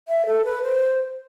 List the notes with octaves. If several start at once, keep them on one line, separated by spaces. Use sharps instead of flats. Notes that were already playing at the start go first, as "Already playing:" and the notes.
E5
A4
B4
C5